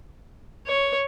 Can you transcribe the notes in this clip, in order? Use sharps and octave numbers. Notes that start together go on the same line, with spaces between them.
C#5